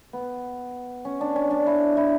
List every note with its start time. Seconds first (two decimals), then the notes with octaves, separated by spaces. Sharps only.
0.13 B3
1.05 C#4
1.21 D4
1.36 C#4
1.51 D4
1.67 E4
1.97 E4